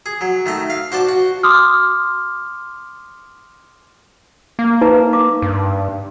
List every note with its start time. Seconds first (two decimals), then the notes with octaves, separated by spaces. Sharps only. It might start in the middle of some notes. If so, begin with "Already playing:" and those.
0.06 G#4
0.21 F#3
0.46 D#3 A3 D#4
0.70 F5
0.92 F#4 C5 D5 A5
1.08 F#4
1.43 C6 D6 D#6 F6
4.59 A#3
4.81 D#4 B4 A#5
5.13 D6
5.42 G2